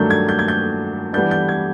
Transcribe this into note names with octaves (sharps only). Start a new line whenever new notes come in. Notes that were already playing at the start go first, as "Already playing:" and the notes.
Already playing: G2 D#3 F#3 A3 D4 G6
G#6
G6
G#6
G6
E3 G3 B3 D4 G6
G6
G#6